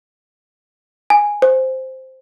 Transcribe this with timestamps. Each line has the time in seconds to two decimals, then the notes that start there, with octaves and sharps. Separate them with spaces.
1.10 G#5
1.42 C5